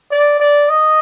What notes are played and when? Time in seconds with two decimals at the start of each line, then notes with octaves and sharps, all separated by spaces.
0.11 D5
0.40 D5
0.69 D#5